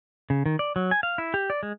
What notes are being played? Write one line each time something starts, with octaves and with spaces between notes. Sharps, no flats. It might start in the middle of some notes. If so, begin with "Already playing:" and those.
C#3
D#3
D5
F#3
G#5
F5
E4
G4
D5
G#3